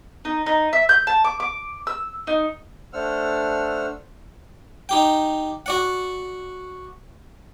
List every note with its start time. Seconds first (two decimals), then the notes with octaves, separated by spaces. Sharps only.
0.25 D#4
0.46 D#4
0.73 E5
0.89 G6
1.07 A5
1.24 D6
1.40 D6
1.87 E6
2.27 D#4
2.93 A3 D4 C5 F#5 E6 F6
4.89 D#4 G4 G5
5.66 F#4 D5 F#5